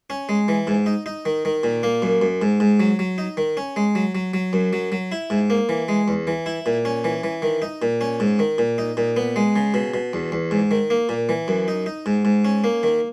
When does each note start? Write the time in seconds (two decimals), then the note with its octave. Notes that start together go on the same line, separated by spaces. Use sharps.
0.10 C#4
0.29 G#3
0.48 E3
0.67 G#2
0.86 D#4
1.06 D#4
1.25 D#3
1.45 D#3
1.63 A#2
1.83 A#3
2.02 F#2
2.22 F#2
2.42 G#2
2.60 G#2
2.80 F#3
2.99 F#3
3.18 D#4
3.37 D#3
3.57 C#4
3.76 G#3
3.95 F#3
4.15 F#3
4.34 F#3
4.53 F#2
4.73 F#3
4.92 F#3
5.12 E4
5.30 G#2
5.50 A#3
5.69 E3
5.88 G#3
6.08 E2
6.27 E3
6.46 E4
6.66 A#2
6.85 C#4
7.04 E3
7.24 E3
7.42 D#3
7.62 D#4
7.82 A#2
8.01 C#4
8.20 G#2
8.39 D#3
8.58 A#2
8.78 D#4
8.97 A#2
9.17 B3
9.36 G#3
9.56 C#3
9.74 B2
9.94 B2
10.13 E2
10.32 E2
10.51 G#2
10.71 D#3
10.90 A#3
11.09 A#2
11.29 E3
11.48 F#2
11.68 D#4
11.86 D#4
12.06 G#2
12.25 G#2
12.45 C#4
12.64 A#3
12.83 D#3